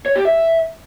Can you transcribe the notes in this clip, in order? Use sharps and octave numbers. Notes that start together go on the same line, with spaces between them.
C#5
G4
E5